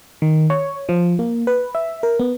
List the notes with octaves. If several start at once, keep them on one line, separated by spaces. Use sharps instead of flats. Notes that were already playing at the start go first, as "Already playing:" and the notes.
D#3
C#5
F3
A#3
B4
E5
A#4
B3